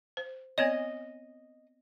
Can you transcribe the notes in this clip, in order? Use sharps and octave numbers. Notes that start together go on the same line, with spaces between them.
C5
B3 C4 C#5 D#5